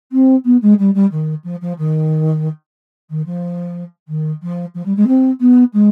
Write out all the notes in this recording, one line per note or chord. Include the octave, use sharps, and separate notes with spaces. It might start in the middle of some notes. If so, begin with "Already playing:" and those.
C4
B3
G#3
G3
G3
D#3
F3
F3
D#3
D#3
F3
D#3
F3
F3
G3
G#3
C4
B3
G#3